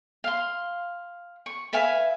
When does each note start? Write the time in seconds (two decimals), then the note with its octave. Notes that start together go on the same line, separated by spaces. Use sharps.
0.24 F5 C6
1.46 C#6
1.73 B4 E5 F5 G#5